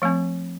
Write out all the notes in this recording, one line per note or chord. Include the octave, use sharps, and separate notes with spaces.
F3 A3 C4